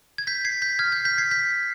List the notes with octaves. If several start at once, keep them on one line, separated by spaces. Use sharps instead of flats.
G#6
G6 B6
G#6 C7
G6 B6
F6 G#6
G6
G6 B6
G#6 C7
G6 B6